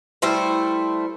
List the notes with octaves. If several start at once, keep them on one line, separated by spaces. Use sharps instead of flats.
G3 A3 E4 C5